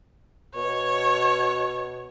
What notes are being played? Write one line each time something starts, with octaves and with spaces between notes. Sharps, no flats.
B2 C#5